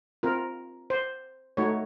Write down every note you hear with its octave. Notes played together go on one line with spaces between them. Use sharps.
C4 F4 A#4
C5
A3 D#4 F#4 C#5